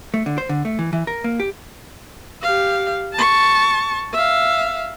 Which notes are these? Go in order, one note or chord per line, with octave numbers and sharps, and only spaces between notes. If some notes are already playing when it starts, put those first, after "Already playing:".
A3
D3
C5
D3
A3
E3
E3
A#4
A#3
G4
G4 F5
A5 C#6
E5 F5